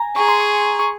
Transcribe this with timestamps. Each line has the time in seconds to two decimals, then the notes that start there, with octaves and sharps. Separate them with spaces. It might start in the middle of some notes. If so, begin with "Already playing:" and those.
Already playing: G#5 A#5
0.16 G#4 C#6
0.28 C6
0.40 C#6
0.79 C#6